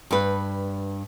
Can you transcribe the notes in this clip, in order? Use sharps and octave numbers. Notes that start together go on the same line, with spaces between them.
G2 B4